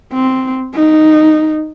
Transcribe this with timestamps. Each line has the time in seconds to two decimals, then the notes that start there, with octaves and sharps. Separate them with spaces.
0.13 C4
0.74 D#4